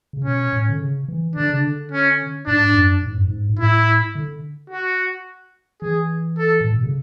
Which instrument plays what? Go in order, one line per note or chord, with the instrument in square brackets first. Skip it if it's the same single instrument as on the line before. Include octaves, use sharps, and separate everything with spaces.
[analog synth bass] C#3
[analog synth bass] B2 [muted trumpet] C#4
[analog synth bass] A2
D3
C#3
E3
[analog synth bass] D3 [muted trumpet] D4
[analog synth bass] C#3
D3
[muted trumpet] C#4
[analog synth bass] G#2 [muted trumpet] D4
[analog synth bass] F#2
G#2
F#2
G#2
G#2
[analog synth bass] A2 [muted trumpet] E4
[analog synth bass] D3
[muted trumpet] F#4
[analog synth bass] E3 [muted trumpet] G#4
[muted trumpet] A4
[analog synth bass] A2
B2
C#3